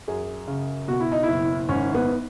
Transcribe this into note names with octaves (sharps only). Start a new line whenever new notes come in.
F#2 G#4
C#3
B2 F#4
E4
D#4
F#1 E4
G#1 C#4
B3